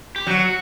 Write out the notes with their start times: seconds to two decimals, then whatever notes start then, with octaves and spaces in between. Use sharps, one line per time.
0.16 G4
0.27 F#3 F#4